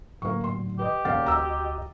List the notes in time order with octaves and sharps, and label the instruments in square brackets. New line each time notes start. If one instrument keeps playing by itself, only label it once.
[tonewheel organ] A2 D3 F#3 [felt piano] A#3 C#6
[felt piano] C6
[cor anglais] G4 [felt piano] B4 D#5
[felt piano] E1 F5 A6 [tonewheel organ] D5
[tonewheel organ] D2 F#4 D#5 [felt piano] A#5 E6